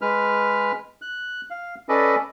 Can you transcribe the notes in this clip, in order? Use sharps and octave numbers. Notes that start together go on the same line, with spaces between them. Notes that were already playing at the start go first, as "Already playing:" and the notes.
G#3 B4 F6
F#6
F5
C#4 A4 B4 D5 D#5